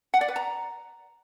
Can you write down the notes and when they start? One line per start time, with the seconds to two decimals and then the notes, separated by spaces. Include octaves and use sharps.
0.14 F#5
0.21 D5
0.28 B4
0.36 A#5